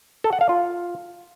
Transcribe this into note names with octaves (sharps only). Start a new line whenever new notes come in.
A4
F#5
F5
F4